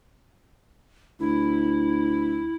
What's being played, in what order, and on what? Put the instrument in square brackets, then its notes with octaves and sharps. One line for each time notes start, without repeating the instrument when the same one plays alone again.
[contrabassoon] D2 [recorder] E4